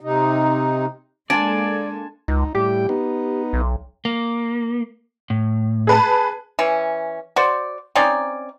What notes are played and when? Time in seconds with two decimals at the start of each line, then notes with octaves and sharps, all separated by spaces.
0.01 C3 D#4
1.30 G#3 A#3 D4 A4 D5 G#5 A5 C6
2.28 C#2 D#4
2.55 A2 G3 G4 G5
2.89 B3 D#4
3.53 B1
4.05 A#3
5.30 A2
5.87 G#4 B4 A5
6.59 E3 C#4
7.36 F#4 C5 D5
7.95 C4 C#4 D#4 D5